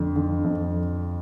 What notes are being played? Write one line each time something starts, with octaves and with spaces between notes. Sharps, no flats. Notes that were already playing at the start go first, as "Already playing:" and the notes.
Already playing: F2 D3
D3
F2